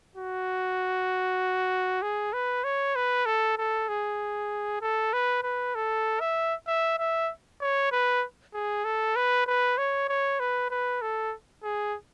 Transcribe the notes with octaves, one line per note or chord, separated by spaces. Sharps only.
F#4
G#4
B4
C#5
B4
A4
A4
G#4
A4
B4
B4
A4
E5
E5
E5
C#5
B4
G#4
A4
B4
B4
C#5
C#5
B4
B4
A4
G#4